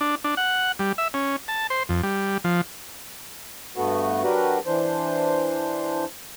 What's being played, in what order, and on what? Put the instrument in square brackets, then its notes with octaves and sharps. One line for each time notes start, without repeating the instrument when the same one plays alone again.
[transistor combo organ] D4
D4
F#5
G3
E5
C#4
A5
C5
F2
G3
F3
[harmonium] G2 A3 B3 F#4
F#3 D4 F#4 G4 A#4 B4
E3 D4 C5